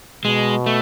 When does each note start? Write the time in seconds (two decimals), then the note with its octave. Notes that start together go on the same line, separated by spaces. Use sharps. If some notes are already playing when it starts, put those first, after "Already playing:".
0.25 B2 G#3
0.66 A3